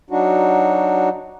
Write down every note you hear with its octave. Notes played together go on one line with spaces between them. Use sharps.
F#3 D4 D#4 F#4